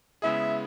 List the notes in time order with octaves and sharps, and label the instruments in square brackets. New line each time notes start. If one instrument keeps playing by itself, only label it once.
[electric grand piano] C#3 G#3 B3 E4 G#4 [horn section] E5